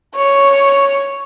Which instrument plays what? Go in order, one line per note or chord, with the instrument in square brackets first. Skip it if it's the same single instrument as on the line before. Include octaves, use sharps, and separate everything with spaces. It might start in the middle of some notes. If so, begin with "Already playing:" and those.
[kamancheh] C#5